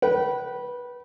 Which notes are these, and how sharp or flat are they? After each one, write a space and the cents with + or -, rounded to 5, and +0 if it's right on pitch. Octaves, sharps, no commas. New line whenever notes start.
B4 -15 G5 -40